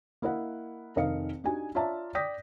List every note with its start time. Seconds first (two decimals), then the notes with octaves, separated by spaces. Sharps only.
0.22 A#3 E4 A#4 D#5 F#5
0.96 F1 D#3 A#4 D#5 F5 C#7
1.44 D4 D#4 F#4 G4 G#5
1.75 F4 C#5 D5 E5 A5 A#5
2.15 D5 G5 D#6 G6 A#6 B6